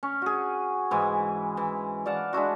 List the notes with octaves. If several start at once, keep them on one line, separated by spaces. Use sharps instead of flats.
C#4
F#4 G#4
G#2 E3 G#3 G#5
E3
D5 F5 F#5 A5
G#3 D4 E4 F#4